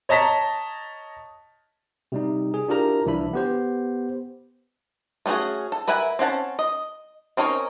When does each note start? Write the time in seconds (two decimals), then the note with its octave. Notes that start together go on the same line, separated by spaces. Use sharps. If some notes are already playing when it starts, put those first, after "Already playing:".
0.09 C#5 D#5 A5 A#5 B6
2.12 C3 G3 D#4
2.54 G#4
2.68 D4 E4 F4 G4 A#4 A#5
3.06 C2 E3 F3 D4 E4 B5
3.33 B3 G4 C5
5.26 A3 C#4 D4 F#4 G#4
5.72 A4
5.88 A#4 B4 E5 F#5 G#5
6.19 C4 C#4 F#5 A5
6.59 D#5
7.37 C4 C#4 D#4 A#4 C#5